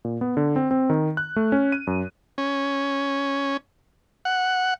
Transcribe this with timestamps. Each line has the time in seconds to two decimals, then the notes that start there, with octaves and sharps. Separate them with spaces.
0.05 A#2
0.21 B3
0.37 D3
0.56 C4
0.71 C4
0.90 D#3
1.17 F#6
1.36 A3
1.52 C#4
1.72 D#7
1.87 F#2
2.38 C#4
4.25 F#5